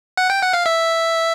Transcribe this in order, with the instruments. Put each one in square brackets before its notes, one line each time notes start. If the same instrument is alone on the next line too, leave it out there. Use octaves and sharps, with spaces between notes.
[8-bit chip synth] F#5
G5
F#5
F5
E5